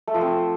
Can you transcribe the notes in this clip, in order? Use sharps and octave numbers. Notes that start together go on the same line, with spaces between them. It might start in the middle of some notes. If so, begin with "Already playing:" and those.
A3
F3
C4